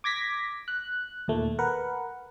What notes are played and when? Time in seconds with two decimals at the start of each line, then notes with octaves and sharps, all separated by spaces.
0.04 D6 G#6 A#6 B6
0.68 F#6
1.28 D#2 A#2 A3
1.59 A#4 B4 F#5